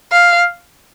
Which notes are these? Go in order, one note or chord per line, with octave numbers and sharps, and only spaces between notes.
F5